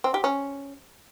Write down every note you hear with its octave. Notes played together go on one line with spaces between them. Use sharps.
C4
G4
C#4